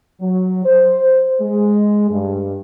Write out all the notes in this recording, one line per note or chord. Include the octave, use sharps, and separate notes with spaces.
F#3
C5
G#3
G2